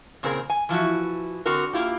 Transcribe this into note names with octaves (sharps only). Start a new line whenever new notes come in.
A#2 C#3 C4 G#4 A#4
G#5
E3 F3 E4 F#4
D3 C4 F#4 A#4
A#3 E4 F4 G4